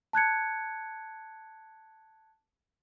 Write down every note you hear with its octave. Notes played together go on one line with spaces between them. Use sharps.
A5 F#6 G#6 C#7